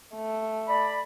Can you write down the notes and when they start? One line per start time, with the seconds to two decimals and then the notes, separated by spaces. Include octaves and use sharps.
0.16 A3
0.67 D5 B5